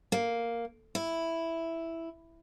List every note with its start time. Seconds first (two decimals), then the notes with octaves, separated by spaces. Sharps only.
0.12 A#3
0.95 E4